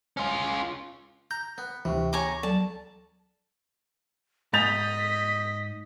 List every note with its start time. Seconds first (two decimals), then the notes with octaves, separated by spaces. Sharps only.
0.17 C#4 F4
1.31 A#5 G6
1.58 B3
1.85 D2 C3 E3 C#6
2.13 C#5 G#5 A#5 D6
2.43 F#3 A4 D5 A5
4.53 G#2 D#5 G6 A6 B6 F7